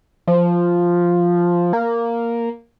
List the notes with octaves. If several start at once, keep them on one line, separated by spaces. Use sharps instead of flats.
F3
A#3